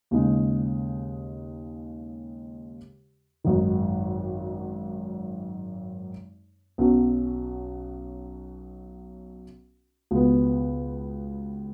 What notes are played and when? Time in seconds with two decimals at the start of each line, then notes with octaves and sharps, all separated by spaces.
0.11 D#2 C#3 G#3 D#4
3.44 G#1 F#2 D#3
6.78 B1 B2 F#3 C#4
10.11 C#2 B2 B3